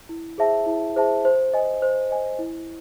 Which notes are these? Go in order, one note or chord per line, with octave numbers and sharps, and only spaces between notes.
E4
G#4 C5 E5 A5
E4
G#4 C5 E5 A5
C5
D#5 G#5
C5
D#5 G#5
E4